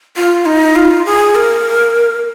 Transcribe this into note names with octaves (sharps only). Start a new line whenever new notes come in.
F4
D#4
F4
G#4
A#4